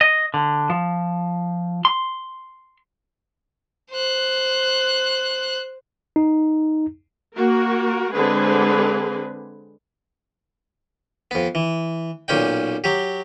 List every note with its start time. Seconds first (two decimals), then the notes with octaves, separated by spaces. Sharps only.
0.01 D#5
0.34 D3
0.70 F3
1.85 C6
3.92 C5 F#6
6.16 D#4
7.35 A#3 F#4 A#4
8.14 D3 G#3 C4 G#4 B4
11.31 F2 B3
11.55 E3
12.28 B1 A#2 C#4 D5 G5
12.84 F#3 G4